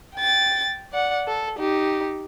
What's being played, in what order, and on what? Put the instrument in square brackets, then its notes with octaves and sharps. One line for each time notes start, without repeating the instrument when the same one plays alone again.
[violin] G5 A6
D5 F#5
A4
D#4 G4